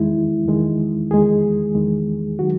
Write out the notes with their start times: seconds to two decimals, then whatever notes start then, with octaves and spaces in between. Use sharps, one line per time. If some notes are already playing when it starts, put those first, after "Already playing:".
Already playing: E2 D#3 G#3 E4
0.46 E2 D#3 G#3
1.11 E2 D#3 G#3 G#4
1.74 E2 D#3 G#3
2.39 D#3 F#3 F#4